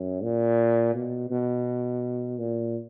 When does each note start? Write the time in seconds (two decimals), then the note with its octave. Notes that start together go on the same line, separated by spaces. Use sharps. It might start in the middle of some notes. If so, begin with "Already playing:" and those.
Already playing: F#2
0.23 A#2
0.94 B2
1.31 B2
2.39 A#2